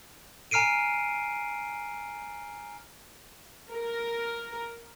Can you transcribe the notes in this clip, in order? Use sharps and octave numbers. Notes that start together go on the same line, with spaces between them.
G#5 A#5 F6 C7 D7 D#7
A#4